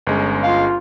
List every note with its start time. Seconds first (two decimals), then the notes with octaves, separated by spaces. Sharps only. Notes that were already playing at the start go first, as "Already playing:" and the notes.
0.07 G1 G#3 C#4
0.43 F4 F5